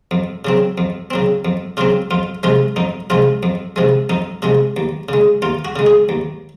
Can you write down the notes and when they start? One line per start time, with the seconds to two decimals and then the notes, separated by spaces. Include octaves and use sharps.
0.11 F2
0.45 C#3 F#3 C4
0.78 F2
1.11 C#3 F#3 C4
1.45 F2
1.77 C#3 F#3 C4 F4
2.11 F2 F4
2.43 C3 F3 G#3 F4
2.76 F2 D#4
3.10 C3 F3 G#3 F4
3.43 F2
3.76 C3 F3 G#3
4.10 F2 D#4
4.42 C3 F3 G#3
4.77 D#2
5.09 C#3 G#3
5.42 D#2 F4
5.65 F#4
5.76 C#3 G#3
5.86 G#4
6.09 D#2